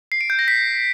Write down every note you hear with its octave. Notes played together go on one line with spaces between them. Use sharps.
C7
D7
G6
A#6
B6